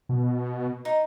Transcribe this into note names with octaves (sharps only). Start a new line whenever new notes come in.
B2
D#4